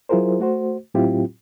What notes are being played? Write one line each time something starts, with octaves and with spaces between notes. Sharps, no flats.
F#3 E4 F4 G#4 A#4 C5
A3 F#4 C5
A2 F#3 C4 E4 F4 G4